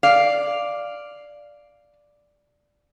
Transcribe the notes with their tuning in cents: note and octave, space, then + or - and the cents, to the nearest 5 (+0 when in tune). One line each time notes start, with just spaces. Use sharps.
D5 +0 F5 +0